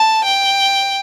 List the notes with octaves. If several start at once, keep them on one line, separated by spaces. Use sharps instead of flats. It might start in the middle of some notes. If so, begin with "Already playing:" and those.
Already playing: A5
G5